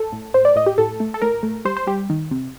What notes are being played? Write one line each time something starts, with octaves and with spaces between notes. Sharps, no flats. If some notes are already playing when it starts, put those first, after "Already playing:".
Already playing: A4
A2
A2 C5
D5
A2 D#5
G4
A2 A4
A3
A4
A2 A#4
A3
G3 C5
C5
G3 G4
D#3
C3